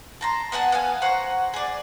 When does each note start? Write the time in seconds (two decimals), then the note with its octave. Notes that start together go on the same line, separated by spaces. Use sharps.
0.21 A5 A#5 C6
0.52 B3 G#4 F#5 A5
0.72 B3 F5 G#5
1.02 C5 F#5 A#5 C#6
1.54 G#4 D5